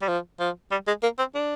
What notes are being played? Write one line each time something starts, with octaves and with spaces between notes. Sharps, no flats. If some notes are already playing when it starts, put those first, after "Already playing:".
G3
F3
F3
G3
G#3
A#3
C4
D4